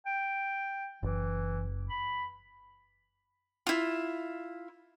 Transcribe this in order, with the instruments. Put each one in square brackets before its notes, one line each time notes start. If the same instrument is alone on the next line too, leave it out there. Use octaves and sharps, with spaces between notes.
[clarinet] G5
[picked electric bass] F#1 [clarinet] E3
[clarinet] B5
[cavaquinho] E4 F4